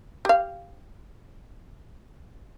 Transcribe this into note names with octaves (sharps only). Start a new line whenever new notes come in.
G4 F5